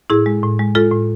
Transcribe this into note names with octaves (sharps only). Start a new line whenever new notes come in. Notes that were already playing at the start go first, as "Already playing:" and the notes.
A2 E4 G#4
G#3
A2
G#3
G#3 F4 A4
A2